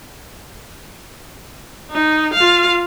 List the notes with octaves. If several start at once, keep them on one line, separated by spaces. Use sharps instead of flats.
D#4
F4 F5